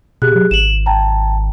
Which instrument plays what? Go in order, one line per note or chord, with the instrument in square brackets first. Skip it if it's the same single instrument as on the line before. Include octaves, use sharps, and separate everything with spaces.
[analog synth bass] B2 [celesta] G4 G#4 F#6
[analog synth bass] F#3
[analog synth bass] G#1 [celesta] E7 F#7
[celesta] G5 A5 A#5